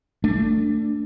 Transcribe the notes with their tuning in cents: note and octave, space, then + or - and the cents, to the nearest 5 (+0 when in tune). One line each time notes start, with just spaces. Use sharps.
A3 +20 D4 +0